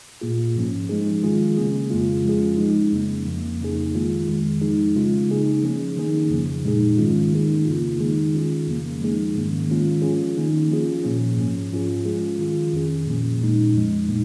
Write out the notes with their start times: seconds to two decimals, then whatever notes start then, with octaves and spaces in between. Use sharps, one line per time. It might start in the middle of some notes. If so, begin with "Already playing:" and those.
0.21 A#2 A#3 F4 G#4
0.55 G#2 F3 C#4
0.89 F3 G#3 D#4 G#4
1.23 D#3 G#3 F4 G#4
1.57 C#3 A#3 C#4 G#4
1.90 F2 C#3 G#3 F4
2.25 F3 G#3 C#4 F4 G#4
2.58 F3 G#3 D#4
2.93 F2 C#3 A#3 C#4
3.26 F2 F3 A#3
3.60 F2 C#3 A#3 D#4 G#4
3.93 D#3 G#3 F4 G#4
4.28 F2 D#3 G#3
4.61 F3 G#3 D#4 G#4
4.96 C#3 G#3 C#4 F4
5.29 C#3 A#3 D#4 G#4
5.62 F3 C#4 G#4
5.97 D#3 A#3 D#4 G#4
6.30 F2 C#3 F3
6.64 A#2 G#3 D#4 G#4
6.97 G#2 D#3 G#3 C#4 F4
7.32 D#3 A#3 D#4 G#4
7.65 F2 C#3 A#3 F4
7.99 D#3 G#3 D#4 G#4
8.33 D#3 C#4 F4 G#4
8.67 F2 C#3 F3 A#3
9.01 F3 G#3 D#4 G#4
9.34 G#2 D#3 A#3 C#4
9.68 D#3 G#3 C#4 F4
10.02 F3 C#4 F4 G#4
10.37 D#3 A#3 D#4
10.70 F3 C#4 F4 G#4
11.03 A#2 F3 A#3 C#4
11.37 G#2 F3 C#4
11.72 G#2 F3 C#4 F4 G#4
12.05 F3 G#3 F4 G#4
12.39 D#3 C#4 F4 G#4
12.73 F2 D#3 C#4 G#4
13.06 A#2 F3 A#3 C#4
13.41 A#2 G#3 D#4
13.74 F2 F3 G#3
14.08 A#2 A#3 D#4